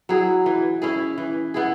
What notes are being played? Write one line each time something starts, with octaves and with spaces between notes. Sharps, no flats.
F#3 E4 G#4
E3
C#4 E4 G#4
E3
B3 E4 G#4